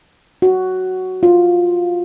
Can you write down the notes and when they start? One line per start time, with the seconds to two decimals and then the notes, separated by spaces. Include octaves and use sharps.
0.42 F#4
1.23 F4